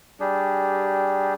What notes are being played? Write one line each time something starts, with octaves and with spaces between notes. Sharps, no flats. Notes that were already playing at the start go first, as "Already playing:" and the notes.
G3 D4 G4 G#4